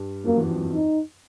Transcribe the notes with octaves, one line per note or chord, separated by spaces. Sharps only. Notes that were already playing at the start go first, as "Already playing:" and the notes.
Already playing: G2 G3
F#2 F#3 A#3
E2 E3
F2 F3
F2 F3
D#4